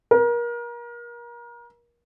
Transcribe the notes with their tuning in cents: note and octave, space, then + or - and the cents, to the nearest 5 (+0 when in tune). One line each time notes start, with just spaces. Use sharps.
A#4 +30